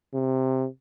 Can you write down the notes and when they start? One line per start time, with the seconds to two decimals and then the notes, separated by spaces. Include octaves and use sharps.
0.14 C3